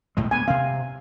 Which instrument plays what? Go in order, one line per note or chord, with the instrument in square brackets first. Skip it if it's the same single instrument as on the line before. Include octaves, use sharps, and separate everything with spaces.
[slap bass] B1 A2 G#3
[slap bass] D2 B3 [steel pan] G#5
[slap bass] C3 C4 [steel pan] F5